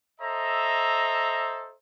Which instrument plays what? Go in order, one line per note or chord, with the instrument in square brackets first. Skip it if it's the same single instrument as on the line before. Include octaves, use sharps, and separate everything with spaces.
[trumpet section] A4 C5 D#5 E5 A#5